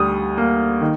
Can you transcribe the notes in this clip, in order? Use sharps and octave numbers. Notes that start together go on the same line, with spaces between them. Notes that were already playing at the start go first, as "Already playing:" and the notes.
Already playing: D2 D3 G3 D#6
A#3
D#3